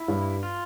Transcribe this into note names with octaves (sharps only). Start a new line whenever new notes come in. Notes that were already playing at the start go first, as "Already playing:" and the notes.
Already playing: E4
G2 G3
F4